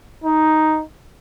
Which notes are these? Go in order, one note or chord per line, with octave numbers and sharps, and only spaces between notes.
D#4